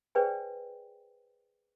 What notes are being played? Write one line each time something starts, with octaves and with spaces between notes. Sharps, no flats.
G#4 B4 C5 D5 G5 G#5